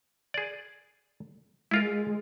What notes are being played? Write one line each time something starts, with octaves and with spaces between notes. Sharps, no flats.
G#4 D5
G#3 E4 F4 A#4